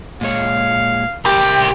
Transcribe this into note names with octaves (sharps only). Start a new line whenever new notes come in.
A#2 G#3 C#5 F5
C2 G4 A#4 G5